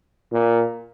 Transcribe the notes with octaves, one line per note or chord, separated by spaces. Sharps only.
A#2